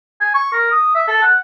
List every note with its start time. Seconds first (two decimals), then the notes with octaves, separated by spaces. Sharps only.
0.21 G#5
0.34 C#6
0.53 A#4
0.71 D#6
0.95 E5
1.08 A4
1.22 F#5